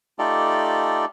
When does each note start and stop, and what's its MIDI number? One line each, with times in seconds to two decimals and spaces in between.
0.19 1.05 57
0.19 1.05 63
0.19 1.05 65
0.19 1.05 67
0.19 1.05 69
0.19 1.05 74